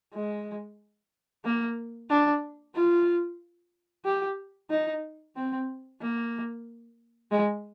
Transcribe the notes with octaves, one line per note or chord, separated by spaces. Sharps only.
G#3
A#3
D4
F4
G4
D#4
C4
A#3
G#3